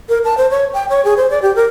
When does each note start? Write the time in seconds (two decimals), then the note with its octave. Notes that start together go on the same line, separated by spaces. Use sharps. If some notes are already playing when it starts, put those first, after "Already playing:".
0.09 A#4
0.25 A5
0.38 C5
0.50 C#5
0.73 G5
0.89 C#5
1.05 G#4
1.17 C5
1.30 D5
1.42 G4
1.56 A#4